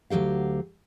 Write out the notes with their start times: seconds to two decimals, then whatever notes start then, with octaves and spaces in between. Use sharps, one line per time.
0.10 D2 D#3 F#3 G4 F5